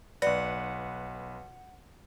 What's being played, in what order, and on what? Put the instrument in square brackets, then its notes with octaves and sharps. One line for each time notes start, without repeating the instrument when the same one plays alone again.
[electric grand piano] B1 B4 [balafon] D5 [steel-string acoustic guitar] F#5